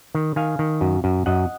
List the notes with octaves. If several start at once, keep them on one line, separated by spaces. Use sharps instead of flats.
D#3
D#3 F5 G#5
D#3
F#2
F#2
F#2 D#5 F#5